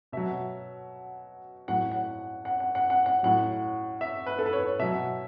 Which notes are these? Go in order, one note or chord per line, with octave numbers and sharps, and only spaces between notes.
B2 F#3 E5
A2 F#3 F#5
F#5
F#5
F#5
F#5
F#5
F#5
A2 F#3 F#5
E5
B4
A4
B4
C#5
B2 F#3 E5